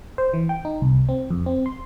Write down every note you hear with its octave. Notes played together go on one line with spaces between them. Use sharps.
C5
E3
G5
D#4
C2
C4
F2
C4
C6